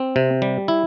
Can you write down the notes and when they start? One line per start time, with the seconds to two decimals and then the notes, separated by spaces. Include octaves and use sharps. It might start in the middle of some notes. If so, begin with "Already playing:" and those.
Already playing: C4
0.16 C3
0.42 G3
0.68 E4